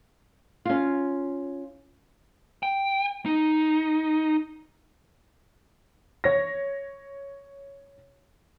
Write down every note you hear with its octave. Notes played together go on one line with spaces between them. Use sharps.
C#4 F4
G5
D#4
C#5 A#6